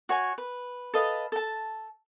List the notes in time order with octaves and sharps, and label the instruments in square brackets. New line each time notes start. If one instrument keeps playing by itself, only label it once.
[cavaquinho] F#4 C#5 G#5
B4
A4 B4 D#5 F5
A4 A5